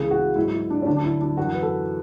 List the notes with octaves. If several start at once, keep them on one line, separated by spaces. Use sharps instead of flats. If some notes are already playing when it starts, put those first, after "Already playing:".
Already playing: C#2 C#3 E3 G#4
F#4
G#2 F#3 E4
E4
D4
C#4
D2 D3 F#3 D4
D4
E4
D4
F#2 E3 F#4
B4
A4